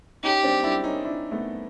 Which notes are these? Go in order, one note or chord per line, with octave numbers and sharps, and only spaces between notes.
C#4 D#4 G4
C4 D4
D4 E4
C#4 D#4
D4 E4
A3 B3